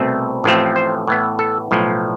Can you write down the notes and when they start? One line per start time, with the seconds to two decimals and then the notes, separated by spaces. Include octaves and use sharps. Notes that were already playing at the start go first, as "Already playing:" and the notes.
Already playing: C2 B2 A3 C4
0.44 A1 A2 F3 A3 C4
0.76 C5
1.07 A2 E3 B3
1.39 A4
1.71 B1 A2 F3